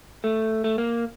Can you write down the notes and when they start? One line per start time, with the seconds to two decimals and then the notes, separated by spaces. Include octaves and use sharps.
0.24 A3
0.64 A3
0.78 A#3